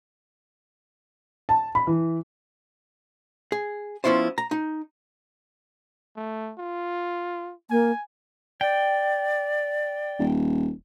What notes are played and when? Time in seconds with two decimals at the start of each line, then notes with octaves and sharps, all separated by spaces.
1.49 A5
1.75 B5
1.87 E3
3.52 G#4
4.04 F3 B3 C#4 E4 F4 C5
4.38 A#5
4.51 D#4
6.17 A3
6.59 F4
7.70 A#3 G#5
8.61 D5 G5
10.19 D#1